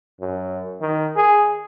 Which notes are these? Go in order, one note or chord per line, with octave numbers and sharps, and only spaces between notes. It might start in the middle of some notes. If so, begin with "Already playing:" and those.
F#2
D#3
G#4